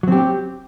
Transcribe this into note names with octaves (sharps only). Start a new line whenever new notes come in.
F#3 C4 G4